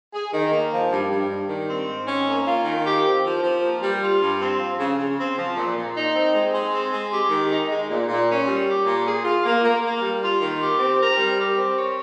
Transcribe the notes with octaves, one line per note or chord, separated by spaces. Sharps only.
G#4
D#3
A#3
F3
G2
G2
G3
D#3
C4
G#2
C#4
A#3
F4
D#3
G4
C4
F3
F3
A#3
G3
F4
G2
C4
F3
C#3
C#3
C4
F3
A#2
A#2
D#4
C4
G#3
G#3
C4
G#3
G4
D#3
D#4
G#3
A#2
A#2
C#4
G3
G4
A#2
G#4
F4
A#3
A#3
A#3
G3
F4
D#3
G4
C4
A#4
G3
G4
C4
C#5